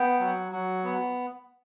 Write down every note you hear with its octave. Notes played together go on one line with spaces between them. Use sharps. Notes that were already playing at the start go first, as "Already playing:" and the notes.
Already playing: B3 G5
F#3
F#3
B3